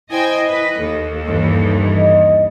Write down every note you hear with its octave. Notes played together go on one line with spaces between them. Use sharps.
E4 C5 D#5 G5 G#5
B4
D#2 A4
G2 E3
D#5